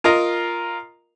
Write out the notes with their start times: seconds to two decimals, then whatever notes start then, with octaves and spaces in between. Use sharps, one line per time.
0.04 F4 A#4 D#5 A#5